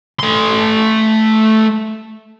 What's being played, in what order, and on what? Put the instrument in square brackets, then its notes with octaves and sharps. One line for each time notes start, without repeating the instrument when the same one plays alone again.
[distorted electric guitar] A3 C6